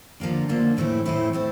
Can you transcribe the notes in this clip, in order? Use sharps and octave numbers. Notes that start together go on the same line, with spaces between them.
D3 F3 A#3 D4
D3 F3 A#3 D4
A2 E3 A3 C4 E4
A2 E3 A3 C4 E4
A3 C4 E4